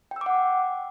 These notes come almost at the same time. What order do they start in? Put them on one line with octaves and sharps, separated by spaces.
G5 E6 D6 F#5